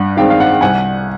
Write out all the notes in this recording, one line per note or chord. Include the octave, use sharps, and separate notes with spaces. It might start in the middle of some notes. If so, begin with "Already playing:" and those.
Already playing: G2 F#5
D#3 G#3 C4 F5 G5
F5
F#5
G5
C2 F#5 G#5